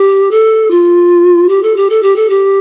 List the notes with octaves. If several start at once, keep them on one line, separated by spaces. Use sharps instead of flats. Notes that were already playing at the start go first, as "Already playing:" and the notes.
Already playing: G4
A4
F4
G4
A4
G4
A4
G4
A4
G4